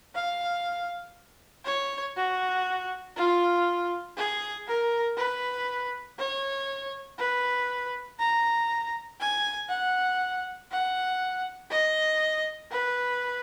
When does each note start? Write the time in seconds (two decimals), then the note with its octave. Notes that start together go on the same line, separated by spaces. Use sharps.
0.15 F5
1.65 C#5
2.16 F#4
3.17 F4
4.16 G#4
4.67 A#4
5.17 B4
6.18 C#5
7.18 B4
8.19 A#5
9.20 G#5
9.69 F#5
10.71 F#5
11.71 D#5
12.71 B4